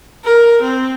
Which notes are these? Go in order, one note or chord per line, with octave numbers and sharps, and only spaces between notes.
A#4
C4